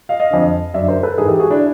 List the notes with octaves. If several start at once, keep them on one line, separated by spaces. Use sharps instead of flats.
D#5 F5
D#5 F5
F2 D3
F#2 D3 D5 E5
A#4 C5
A4 B4
G#2 E3 G#4 A#4
G4 A4
F#4 G#4
D4 E4